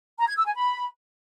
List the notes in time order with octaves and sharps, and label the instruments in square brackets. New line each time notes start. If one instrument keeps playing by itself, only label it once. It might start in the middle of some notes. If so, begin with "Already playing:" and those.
[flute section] A#5
G#6
E6
G#5
B5